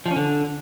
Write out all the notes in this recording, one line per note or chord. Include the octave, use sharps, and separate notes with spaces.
F3
C#4
D3